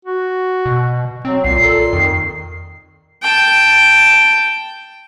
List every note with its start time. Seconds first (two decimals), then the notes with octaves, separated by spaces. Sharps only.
0.05 F#4
0.66 B2
1.25 F#3 C4
1.44 C2 A#2 C7
1.64 A4
1.93 F2 D#3
3.22 G5 A5